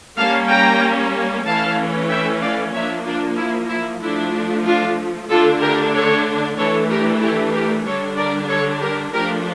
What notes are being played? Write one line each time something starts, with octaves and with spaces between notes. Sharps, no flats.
G3 A#3 C#4 F5 A5
G5 A#5
E3 A3 C#4 F5 A5
E5 G5
D5 F5
F3 A#3 D4 C#5 E5
D4 F4
E4
E4
F3 A3 D4 E4
D4 F4
D3 A3 D4 F4 A4
G4 A#4
A4 C#5
E3 A3 D4 A4 C#5
G4 A#4
E4 G4
G4 A#4
D3 G3 D4 A4 C#5
A#4 D5
A4 C#5
G4 A#4
F3 A3 D4 G4 A#4